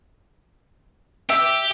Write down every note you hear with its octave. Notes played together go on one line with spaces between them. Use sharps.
G4 E5